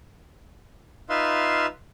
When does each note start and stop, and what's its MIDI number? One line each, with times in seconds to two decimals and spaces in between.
1.09 1.66 63
1.09 1.66 65
1.09 1.66 71
1.09 1.66 76
1.09 1.66 77
1.09 1.66 84